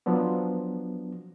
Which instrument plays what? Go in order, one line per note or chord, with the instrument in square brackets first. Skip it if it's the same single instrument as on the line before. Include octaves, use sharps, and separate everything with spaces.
[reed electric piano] F3 F#3 B3 D4